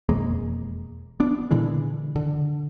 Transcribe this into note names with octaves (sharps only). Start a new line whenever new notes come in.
E1 F2 G#3 A#3
B3 D4
A#2 D3 E3 G#3
D3